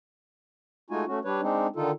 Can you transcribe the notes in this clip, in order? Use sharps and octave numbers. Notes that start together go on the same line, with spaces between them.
G#3 A3 D#4 F4 F#4 G#5
A3 C#4 F#4
G3 D4 B4 C#5
G#3 C4 D4 D#4
D3 D#3 D#4 F4 A4